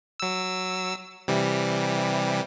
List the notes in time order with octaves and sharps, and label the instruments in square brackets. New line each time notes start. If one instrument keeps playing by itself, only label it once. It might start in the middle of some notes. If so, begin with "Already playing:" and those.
[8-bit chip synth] F#3 E6
C3 E3 G3